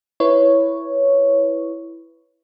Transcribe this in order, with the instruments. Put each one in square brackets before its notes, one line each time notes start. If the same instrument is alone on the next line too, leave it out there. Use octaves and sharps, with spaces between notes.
[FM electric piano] E4 B4 C#5